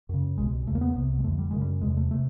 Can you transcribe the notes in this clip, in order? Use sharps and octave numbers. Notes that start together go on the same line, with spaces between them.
F#2 C#3
C2 B2 G#3
E2 C#3 A3
A#3
B3
C2 C3
G#3
F2 D3 A3
G3
F#2 C#3 G#3
G3
E2 C3 G#3
A3
A3
C3